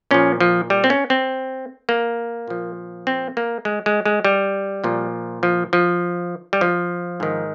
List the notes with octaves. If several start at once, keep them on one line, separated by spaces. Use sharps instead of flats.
A#2 F3 C#4
F3
G3
C4
C#4
C4
A#3
A#2 F3
C4
A#3
G#3
G#3
G#3
G3
A#2 F3
F3
F3
G3
F3
G#2 D#3